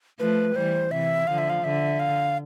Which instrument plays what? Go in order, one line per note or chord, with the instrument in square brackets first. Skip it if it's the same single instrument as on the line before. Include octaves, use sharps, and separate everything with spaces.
[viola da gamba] F3 A3 [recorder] B4
[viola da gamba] E3 G3 [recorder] C5
[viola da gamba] C3 E3 [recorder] E5
[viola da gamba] D3 F3 [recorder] F5
[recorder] E5
F5
[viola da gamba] D3 [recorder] E5
[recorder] F5